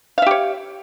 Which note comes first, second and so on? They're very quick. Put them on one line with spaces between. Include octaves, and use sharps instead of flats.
F5 E5 G4 C#5